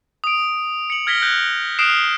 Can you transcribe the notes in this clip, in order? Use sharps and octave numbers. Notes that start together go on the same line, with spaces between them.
D#6 D7
C#7 F#7
F6 G#6 A#6 B6 G7
F#6 G6
D#6 F6 F#6 C7 D7 E7